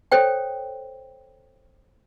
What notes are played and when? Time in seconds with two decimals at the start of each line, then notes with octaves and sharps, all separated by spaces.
0.12 A4 C5 C#5 G5